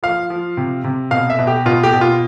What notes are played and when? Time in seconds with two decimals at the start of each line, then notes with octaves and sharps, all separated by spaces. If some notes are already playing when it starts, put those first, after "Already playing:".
0.03 F3 F5
0.30 F3
0.57 C3
0.84 C3
1.11 B2 F5
1.30 E5
1.39 B2
1.47 G4
1.66 B2 F4
1.83 G4
1.93 B2
2.01 F4